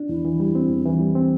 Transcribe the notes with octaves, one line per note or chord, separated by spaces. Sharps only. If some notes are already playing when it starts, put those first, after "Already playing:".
Already playing: D4
E2 E4
E3
G3
C4
E2
E3
G3
C4